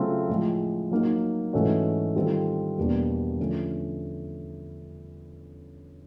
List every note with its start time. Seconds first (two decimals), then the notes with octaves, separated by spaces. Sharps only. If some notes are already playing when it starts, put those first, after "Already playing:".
Already playing: C#3 F#3 A3 C4 F4
0.29 A2 F3 G#3
0.91 F#3 A#3 D#4
1.53 G#2 E3 A3 C#4 F#4
2.15 D#3 G3 C4 F4 A4
2.78 E2 B2 G3 A#3 D4
3.39 D3 F3 A3 C#4